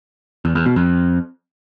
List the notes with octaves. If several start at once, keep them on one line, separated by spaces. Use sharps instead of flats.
E2
E2
B2
F2